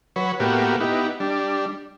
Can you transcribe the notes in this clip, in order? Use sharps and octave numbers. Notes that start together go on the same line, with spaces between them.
F#3 B4 C#5
A2 A#3 B3 F#4 G4
B3 D#4 E4 G4
G3 D4